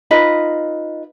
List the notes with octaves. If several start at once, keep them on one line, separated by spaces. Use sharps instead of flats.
D#4 F4 B4 D#5